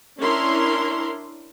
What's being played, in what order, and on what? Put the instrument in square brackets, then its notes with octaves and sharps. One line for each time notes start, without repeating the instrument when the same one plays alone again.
[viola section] C#4 D4 E4 A#4 C6